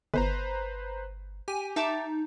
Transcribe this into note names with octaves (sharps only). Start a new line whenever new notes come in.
G1 B4 C5 A#5
G4 G#5
D#4 E5 A5 D6